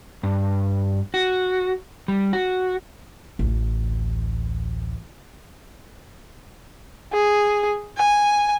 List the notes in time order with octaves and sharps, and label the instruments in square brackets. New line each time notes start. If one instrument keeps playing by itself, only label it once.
[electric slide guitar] G2
F#4
G3
F#4
[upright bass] A1 D2
[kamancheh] G#4
G#5